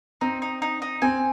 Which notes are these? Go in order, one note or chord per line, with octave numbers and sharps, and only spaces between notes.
C4 D#4
D#4
D#4
D#4
C4 G#5